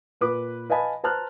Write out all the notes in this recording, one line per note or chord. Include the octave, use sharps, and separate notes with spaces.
A#2 B4 D6
B4 D#5 F5 G#5 A5 B5
B4 C5 A5 A#5 F6 F#6